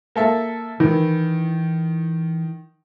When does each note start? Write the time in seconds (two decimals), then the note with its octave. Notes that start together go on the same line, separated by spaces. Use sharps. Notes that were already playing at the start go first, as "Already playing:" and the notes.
0.16 A#3 A4 E5
0.80 D#3 E3